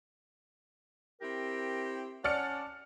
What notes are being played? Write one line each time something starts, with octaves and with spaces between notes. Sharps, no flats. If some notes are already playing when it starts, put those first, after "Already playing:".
C4 E4 G4 A#4
C#4 D5 F#5 A5 F6 C#7